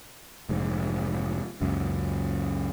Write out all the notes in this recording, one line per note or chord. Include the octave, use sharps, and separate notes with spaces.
F1 G#2
C#2 F#2 F#3